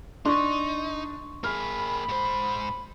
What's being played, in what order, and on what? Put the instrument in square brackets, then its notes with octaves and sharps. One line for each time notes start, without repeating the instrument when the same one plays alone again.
[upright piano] D4 [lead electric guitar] D#4 [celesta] C6 C#6
[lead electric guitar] A#3 G#4 [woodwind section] B5 [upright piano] F6
[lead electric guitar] G#2 C5